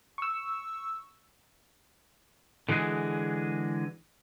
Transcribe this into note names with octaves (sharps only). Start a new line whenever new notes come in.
C#6 E6
D3 E3 G#3 F#4 G#4